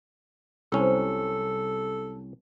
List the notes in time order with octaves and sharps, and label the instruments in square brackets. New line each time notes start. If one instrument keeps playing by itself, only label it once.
[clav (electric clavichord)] C2 C#4 [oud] F#3 G4 C5 [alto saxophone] A4